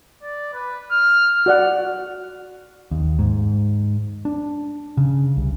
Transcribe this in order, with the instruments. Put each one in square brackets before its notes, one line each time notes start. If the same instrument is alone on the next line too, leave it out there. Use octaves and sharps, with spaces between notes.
[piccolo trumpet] D5
B4
F6
[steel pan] F#4 D5 F#5
[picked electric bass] D#2
G#2
D4
C#3
C2